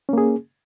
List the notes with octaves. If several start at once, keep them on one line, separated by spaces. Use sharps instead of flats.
A#3 C#4 G#4